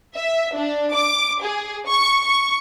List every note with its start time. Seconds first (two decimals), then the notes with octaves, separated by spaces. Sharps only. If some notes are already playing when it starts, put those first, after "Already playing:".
0.14 E5
0.55 D4
0.92 D6
1.41 G#4
1.87 C#6
2.26 C#6